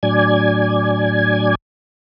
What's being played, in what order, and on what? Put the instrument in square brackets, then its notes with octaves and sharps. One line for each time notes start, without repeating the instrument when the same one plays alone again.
[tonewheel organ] A2 F#3 D4 D5 G#5 G#6